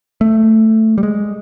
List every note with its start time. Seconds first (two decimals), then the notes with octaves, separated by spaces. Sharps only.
0.21 A3
0.98 G3
1.03 G#3